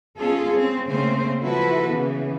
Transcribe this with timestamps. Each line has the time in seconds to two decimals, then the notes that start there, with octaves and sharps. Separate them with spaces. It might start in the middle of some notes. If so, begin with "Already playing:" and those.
0.18 G#3 B3 C#4 F4 G#4 A4
0.55 C4 C#4
0.88 C#3 A3 A#3 C4 C#4 C5
1.43 F3 E4 F#4 A4 B4
1.86 C#3 E3 B3